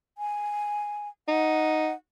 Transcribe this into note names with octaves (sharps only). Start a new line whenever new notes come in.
G#5
D#4 F#5